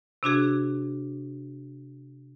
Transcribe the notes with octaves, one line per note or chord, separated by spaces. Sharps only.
C3 D4 F#4 G#4